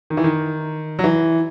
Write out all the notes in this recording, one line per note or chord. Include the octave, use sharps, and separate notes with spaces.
D#3
E3
D#3
F#3
E3